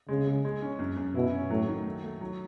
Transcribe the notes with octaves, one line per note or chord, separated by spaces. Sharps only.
C#3 G#3
G#3
G#3
C#4
F#2
F#2
B2 E4
C#4
A2 F#3
D#3
A3
A3
F#3